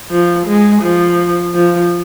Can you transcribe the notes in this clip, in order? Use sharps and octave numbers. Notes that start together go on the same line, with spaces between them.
F3
G#3
F3
F3